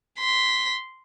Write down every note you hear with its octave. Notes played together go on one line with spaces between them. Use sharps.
C6 B6